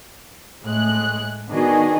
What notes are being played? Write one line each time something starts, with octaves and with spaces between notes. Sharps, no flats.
A2 G#3 F#6
D#3 B3 D4 F#4 G#4 D#5